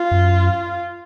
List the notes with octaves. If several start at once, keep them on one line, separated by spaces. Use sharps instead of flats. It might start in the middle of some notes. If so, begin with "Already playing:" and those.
Already playing: F4
F#2